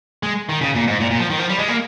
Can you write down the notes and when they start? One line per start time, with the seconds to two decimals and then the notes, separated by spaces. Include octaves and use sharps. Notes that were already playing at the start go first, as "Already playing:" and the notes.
0.23 G#3
0.49 D#3
0.61 C#3
0.75 A#2
0.88 G#2
1.00 A#2
1.11 A#2
1.19 F3
1.30 D#3
1.39 F3
1.49 G3
1.59 G#3
1.68 A#3